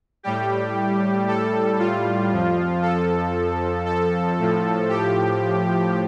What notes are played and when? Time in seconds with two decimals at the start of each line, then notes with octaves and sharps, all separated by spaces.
0.23 A2 G3 G4
1.28 A4
1.79 F4
2.31 F2 F3
2.82 A4
3.86 A4
4.39 A2 F3
4.89 G4